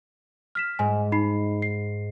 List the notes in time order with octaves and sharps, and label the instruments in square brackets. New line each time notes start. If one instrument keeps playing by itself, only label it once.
[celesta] F6 B6 E7
[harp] G#2 [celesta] G#5
[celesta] D#4 B5 C7
C7